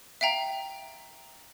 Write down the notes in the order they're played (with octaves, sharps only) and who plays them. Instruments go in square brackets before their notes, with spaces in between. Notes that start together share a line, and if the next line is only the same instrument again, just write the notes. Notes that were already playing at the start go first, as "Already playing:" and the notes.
[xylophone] E5 F5 G5 A#5